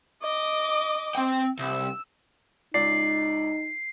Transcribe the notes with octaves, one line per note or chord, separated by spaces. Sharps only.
D#5 D6
C4 G5
C2 E6
C#2 D#4 D5 C7